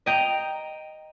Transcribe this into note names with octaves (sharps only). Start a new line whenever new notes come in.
D#5 G5 A#5